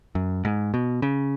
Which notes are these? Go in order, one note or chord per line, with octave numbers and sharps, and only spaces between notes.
F#2
G#2
B2
C#3